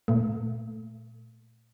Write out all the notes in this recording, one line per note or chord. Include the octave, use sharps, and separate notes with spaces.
A#2 A3